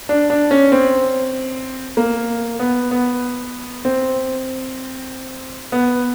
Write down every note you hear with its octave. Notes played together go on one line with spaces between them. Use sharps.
D4
D4
C#4
C4
A#3
B3
B3
C4
B3